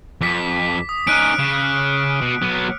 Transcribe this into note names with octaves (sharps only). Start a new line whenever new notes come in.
F2 D6 B6
D#6
C#4 D#4 F6 F#6 D7
C#3
B2
F#3 B3